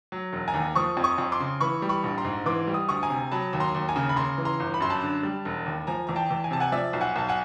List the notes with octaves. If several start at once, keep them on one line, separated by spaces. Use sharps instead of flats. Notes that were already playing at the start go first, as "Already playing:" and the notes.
F#3
E1
G#5 A#5
D#2
F3 C#6 D#6
F2
C#6 D#6
F2
C6 D6
C#3
E3 B5 C#6
G3
B5 C#6
A#1
A#5 C6
G#2
E3 C6 D6
G3
D#6
D2 C#6 D#6
G#5 A#5
C3
F#3 A5 B5
D#2
A#5 C6
D#2
G#5 A#5
C#3
B5
C#3 A#5 C6
E3
A#5 C6
G1
B5
F#2 C6
A5 B5
D3
G3
E1
D#2
F3 G#5 A#5
E2 A#5
G5 A5
E2
G#5
C3 A5
F#5 G#5
F3 D5 E5
B1
F#5 G#5
B1 A5
F#5 G#5